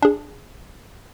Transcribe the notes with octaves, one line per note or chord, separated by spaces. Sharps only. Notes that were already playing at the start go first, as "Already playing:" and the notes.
D4 G#4